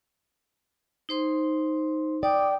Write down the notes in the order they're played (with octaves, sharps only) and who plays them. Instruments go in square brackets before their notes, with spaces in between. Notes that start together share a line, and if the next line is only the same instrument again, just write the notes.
[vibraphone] D#4 C5 C6
[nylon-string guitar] D5 [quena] G5 [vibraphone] D6 D#6